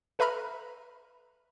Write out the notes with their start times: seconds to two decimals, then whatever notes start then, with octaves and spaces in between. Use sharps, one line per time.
0.19 A4 B4 E5 A#5 B5 F6